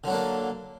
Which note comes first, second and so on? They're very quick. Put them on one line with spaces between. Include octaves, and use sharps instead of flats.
D3 F#3 D4 A#3